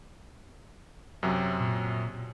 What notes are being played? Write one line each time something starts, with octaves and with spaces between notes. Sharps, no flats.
F#2 C3 F#3
A#2